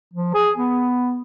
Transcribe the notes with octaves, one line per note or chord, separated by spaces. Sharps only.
F3
G#4
B3